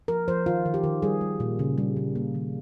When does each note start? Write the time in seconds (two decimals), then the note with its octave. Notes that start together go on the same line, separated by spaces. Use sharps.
0.08 F3 A#4
0.28 F3 C5
0.46 D#3 F4
0.66 D#3
0.74 G4
0.84 D#3
1.02 G3 G#4
1.21 G3
1.40 A#2
1.59 C#3
1.78 G3
1.96 C#3
2.15 A#3
2.35 D#3